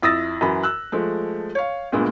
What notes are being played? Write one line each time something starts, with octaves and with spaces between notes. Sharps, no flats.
F2 E4 D#6 E6 A6 A#6
F#2 E3 F#4 B5
E6 F#6
F3 G#3 A3
C#5 F5
D2 G2 A#2 G#3 A#3 B3